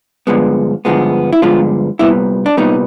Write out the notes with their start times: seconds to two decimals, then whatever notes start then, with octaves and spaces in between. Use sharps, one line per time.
0.27 G2 D3 F3 G#3 B3
0.85 G2 D3 F3 G#3 B3
1.33 E4
1.42 G2 D3 F3 G#3 B3 F4
1.99 C2 A#2 G3 B3 E4
2.46 D4
2.57 C2 A#2 G3 B3 D#4